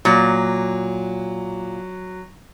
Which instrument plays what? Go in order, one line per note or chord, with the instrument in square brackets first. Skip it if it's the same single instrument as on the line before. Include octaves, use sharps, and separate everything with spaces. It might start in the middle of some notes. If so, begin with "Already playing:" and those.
[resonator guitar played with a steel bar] A#2 [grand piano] F#3